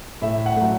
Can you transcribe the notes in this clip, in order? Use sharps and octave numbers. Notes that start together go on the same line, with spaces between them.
A2 E5
F#5
F#3 A3